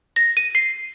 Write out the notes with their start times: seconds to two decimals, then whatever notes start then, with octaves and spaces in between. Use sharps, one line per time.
0.16 A#6
0.37 D#7
0.55 C7